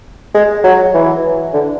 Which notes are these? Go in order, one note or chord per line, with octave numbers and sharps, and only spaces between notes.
G#3
F#3
E3
D3